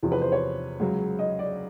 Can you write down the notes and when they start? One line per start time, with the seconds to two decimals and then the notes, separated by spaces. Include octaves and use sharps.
0.03 E2 C3 F3
0.12 B4
0.21 C5
0.32 C#5
0.80 C#2 C#3 F#3
1.19 D#5
1.39 D5